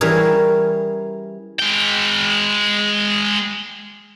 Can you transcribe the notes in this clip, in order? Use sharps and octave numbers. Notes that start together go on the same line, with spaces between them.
E3 G3 C#4 G#4 A#4 C#5
G#3 G5